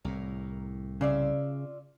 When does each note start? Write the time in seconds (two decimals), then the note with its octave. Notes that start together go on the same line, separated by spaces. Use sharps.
0.05 C2 A2 A#4
1.01 C#3 F4 D5 E5